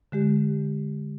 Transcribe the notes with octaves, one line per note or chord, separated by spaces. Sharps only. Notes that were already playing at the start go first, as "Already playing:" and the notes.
D3 G#3 G4